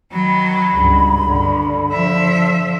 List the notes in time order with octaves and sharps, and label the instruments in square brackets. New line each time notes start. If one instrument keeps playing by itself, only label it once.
[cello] D#3 F#3 [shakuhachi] B5
[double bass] C#2 G2
[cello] G2 [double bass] D3
[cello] F3 E5